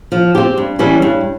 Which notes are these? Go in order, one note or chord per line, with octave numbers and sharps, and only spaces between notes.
F3
C4 G4
G2
E3 G3 C#4
G2